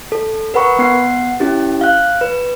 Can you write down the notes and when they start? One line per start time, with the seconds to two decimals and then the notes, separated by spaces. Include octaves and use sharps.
0.12 A4
0.54 A#4 B4 F#5 B5 C#6
0.79 B3 F#5 C7
1.40 C#4 E4 G4
1.81 F5 F#6
2.21 B4